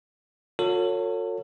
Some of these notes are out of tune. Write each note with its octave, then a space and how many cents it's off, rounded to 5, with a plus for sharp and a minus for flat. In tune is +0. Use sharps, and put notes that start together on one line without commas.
F#4 -45 A4 +40 C#5 +0